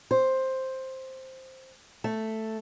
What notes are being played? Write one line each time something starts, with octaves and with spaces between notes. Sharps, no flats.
C5
A3